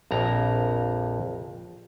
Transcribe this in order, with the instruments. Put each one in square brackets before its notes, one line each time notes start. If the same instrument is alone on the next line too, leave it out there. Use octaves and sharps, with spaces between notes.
[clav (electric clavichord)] A#1 F2 A#5